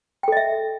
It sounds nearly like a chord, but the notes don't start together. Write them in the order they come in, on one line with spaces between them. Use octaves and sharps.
G5 A4 D#5 E5